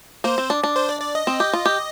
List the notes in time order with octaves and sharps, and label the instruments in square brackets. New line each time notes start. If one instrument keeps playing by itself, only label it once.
[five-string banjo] A#3 [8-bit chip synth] C5
[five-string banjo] C4
D4
D4
[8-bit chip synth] C5
D5
D5
D#5
[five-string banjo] C4
G4
F4
G4